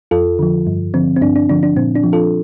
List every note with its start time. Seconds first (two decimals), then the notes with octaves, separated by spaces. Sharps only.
0.11 F2 F4 A4
0.39 D3 F3
0.67 G2
0.94 D3 F3 C4
1.16 C4
1.21 G2 D4
1.36 D4
1.49 D3 F3 D4
1.63 D4
1.76 A#2 C4
1.95 D4
2.03 F3
2.13 F4 A4